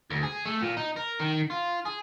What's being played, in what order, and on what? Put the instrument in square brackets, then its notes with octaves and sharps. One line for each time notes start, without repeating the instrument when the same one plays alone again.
[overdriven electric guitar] D2
G#4
A3
A#2
D#4
A#4
D#3
F4
G#4